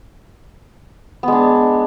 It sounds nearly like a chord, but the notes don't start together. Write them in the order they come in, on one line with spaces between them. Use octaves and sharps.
B3 G#3 D4